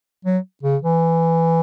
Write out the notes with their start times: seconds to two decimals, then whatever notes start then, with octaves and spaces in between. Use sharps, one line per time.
0.25 F#3
0.63 C#3
0.82 E3